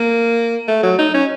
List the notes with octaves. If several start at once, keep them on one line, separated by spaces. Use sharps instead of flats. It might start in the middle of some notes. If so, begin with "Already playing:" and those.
Already playing: A#3
A3
F#3
D#4
C#4